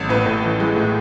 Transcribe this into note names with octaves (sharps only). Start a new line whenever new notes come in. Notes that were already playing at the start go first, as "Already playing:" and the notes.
Already playing: A1
A2 B4
A2
E3
G#3
A2